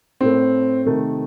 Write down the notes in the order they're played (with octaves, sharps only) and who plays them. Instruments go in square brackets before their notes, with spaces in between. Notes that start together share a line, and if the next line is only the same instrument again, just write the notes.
[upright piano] A2 A3 C4
C3 D#3 A3